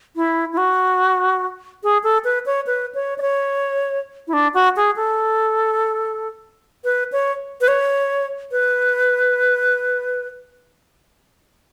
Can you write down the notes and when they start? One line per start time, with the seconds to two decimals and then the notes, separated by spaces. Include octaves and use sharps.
0.16 E4
0.53 E4
0.57 F#4
1.83 G#4
2.03 A4
2.24 B4
2.46 C#5
2.67 B4
2.95 C#5
3.18 D5
3.22 C#5
4.27 E4
4.33 D4
4.54 F#4
4.76 G#4
4.96 A4
6.84 B4
7.12 C#5
7.61 B4
7.68 C#5
8.52 B4